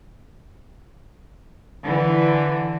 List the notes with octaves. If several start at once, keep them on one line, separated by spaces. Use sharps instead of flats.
D3 E3